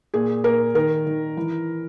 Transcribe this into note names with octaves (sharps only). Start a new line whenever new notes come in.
A#2 G#4
A#2 A#4
D#3 A#4
D#3
E3